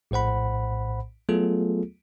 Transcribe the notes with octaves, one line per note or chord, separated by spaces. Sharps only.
A#1 A2 C5 F#5 B5
F#3 A3 B3 F4 G#4 A4